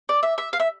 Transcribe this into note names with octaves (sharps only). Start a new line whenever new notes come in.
D5
E5
E5
F5
E5